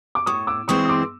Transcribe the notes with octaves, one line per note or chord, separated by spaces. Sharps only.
D6
A2 C#6 D#6
D6 E6
E3 G#3 C4 C#6 D#6
D#6
C6 D6